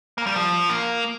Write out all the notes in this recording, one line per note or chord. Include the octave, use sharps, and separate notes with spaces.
A#3
G3
F3
A#3